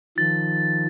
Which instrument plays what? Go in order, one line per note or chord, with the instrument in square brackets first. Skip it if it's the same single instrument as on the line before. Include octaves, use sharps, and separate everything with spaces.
[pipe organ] D#3 F3 [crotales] A6